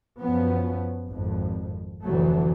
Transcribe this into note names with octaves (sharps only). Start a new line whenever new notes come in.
F#2 F3 B3 C#4
G#1 F2
F1 D2 E3 F#3 A3